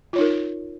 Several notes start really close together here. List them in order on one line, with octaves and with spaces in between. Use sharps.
F4 C#5 D#4 A#4